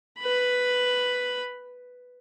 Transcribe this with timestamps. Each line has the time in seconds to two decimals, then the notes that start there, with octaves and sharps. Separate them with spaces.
0.20 B4 B5